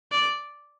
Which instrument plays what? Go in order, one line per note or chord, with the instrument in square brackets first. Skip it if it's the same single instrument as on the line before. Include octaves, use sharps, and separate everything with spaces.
[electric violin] D5